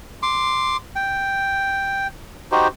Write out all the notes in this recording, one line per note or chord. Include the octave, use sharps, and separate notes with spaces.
C6 D6
G5
D#4 F#4 G4 C5